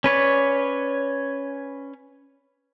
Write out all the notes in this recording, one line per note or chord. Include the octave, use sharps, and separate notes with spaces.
C#4 B4 C#5 D5